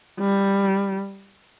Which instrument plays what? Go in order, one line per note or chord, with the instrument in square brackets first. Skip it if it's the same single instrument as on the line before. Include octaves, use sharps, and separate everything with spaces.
[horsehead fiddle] G3